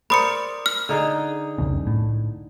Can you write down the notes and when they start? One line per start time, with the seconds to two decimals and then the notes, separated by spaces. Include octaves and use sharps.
0.10 A#4 C5 D5 B5 D#6 C#7
0.66 F6
0.89 D3 D#4 G#4
1.58 C2 F2 C#3
1.87 A2